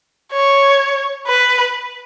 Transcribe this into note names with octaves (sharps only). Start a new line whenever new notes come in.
C#5
B4